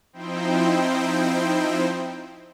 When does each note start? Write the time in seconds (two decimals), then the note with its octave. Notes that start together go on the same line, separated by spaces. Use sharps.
0.13 F3 C4 D#4 E4 C5 G5